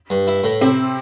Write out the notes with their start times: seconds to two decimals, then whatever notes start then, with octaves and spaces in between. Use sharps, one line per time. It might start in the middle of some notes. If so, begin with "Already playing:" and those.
0.10 G2
0.27 E4
0.44 A2
0.61 C3 C4 E4